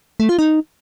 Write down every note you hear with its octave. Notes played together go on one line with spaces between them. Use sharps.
A3
F4
D#4